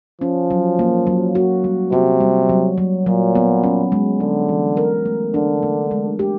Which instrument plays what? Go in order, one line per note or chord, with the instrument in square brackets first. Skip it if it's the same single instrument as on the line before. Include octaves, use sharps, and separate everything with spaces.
[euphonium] F3 [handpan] C#4
[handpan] F#3
A#3
F#3
F#4
G3
[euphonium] C3 [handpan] F#4
[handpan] G3
F#3
F#3
[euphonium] A#2 [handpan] F#3
[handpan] B3
C#4
G#3
[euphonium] D3 [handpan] G#3
[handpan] E3
A#4
A3
[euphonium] D3 [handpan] D4
[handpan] A3
G#3
G4